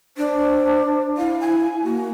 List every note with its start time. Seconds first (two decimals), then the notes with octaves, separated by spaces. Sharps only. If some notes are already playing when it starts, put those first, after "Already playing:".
0.17 D4 C5
1.17 E4 F5
1.40 G#5
1.84 A#3 F#4